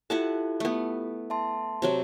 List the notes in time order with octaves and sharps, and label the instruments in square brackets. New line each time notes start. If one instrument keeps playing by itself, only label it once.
[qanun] E4 F#5 A5 [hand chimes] F4 G4 A4
[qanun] A3 B3
[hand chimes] E5 A5 C6
[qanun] C3 F#3 C4